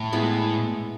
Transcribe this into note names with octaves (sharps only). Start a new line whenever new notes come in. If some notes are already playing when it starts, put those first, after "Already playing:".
Already playing: A2
G#3 B3 E4